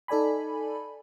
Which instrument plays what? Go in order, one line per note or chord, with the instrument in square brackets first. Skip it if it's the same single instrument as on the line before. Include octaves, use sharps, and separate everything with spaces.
[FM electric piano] D#4 A4 D5 G#5 B5